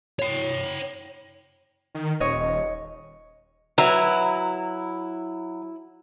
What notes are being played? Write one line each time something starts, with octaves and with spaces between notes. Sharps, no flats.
C#5 G5
D#3
D#1 C#5 D#5
F#3 E4 B4 A#5